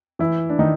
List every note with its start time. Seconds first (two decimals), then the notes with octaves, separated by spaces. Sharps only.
0.19 E3 E4
0.50 D4
0.59 D#3 D#4